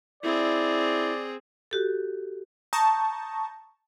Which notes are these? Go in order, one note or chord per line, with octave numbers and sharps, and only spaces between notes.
C4 E4 G#4 D5
F#4 G4 A4
A5 A#5 C#6 D#6 G6 A#6